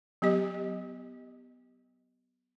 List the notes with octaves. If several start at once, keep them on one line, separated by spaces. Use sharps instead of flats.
F#3 B3 G4 D#5